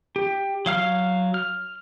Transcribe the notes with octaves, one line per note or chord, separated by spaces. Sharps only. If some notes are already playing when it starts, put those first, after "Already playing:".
G4
F#3 F5 F6
F6